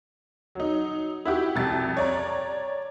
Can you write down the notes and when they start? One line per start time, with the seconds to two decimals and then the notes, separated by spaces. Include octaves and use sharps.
0.55 F#3 D#4
1.26 E4 F#4 G4
1.55 C2 F2 A6
1.97 C#5 D5 A#5